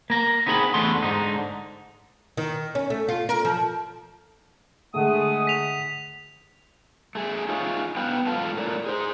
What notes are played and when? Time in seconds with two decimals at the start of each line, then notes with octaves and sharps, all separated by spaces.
0.10 A#3 A#5
0.46 B3 C4 D#4 G#4 A#5 B5
0.74 E2 D3 A3 B3 C6
1.03 G#2 D3 D#4
2.37 D#3
2.75 C#4
2.90 A3
3.09 F4
3.29 A#4
3.45 F3
4.94 D3 G#3 A3 G#4 F#5 D#6
5.47 B6 F7
7.15 A3 G#4
7.49 D#4 F4 G#4 C#5
7.97 B3 B4 F5 G5
8.27 G#2 F4 A4 F5 A5
8.57 A2 A#4 D5
8.86 G#4 C5